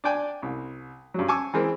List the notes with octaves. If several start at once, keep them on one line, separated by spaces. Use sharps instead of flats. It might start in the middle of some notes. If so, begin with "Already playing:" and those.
D4 D5 G5 G#5
C2
G2 F#3
G#5 A5 C#6 D6 E6
E3 G#3 C4 A#4